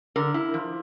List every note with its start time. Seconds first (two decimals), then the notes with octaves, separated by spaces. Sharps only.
0.16 D3 A#4
0.34 E4
0.54 F3